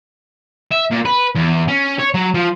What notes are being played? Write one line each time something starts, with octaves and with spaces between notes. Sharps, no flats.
E5
A#2
B4
E2
C#4
C#5
F#3
F3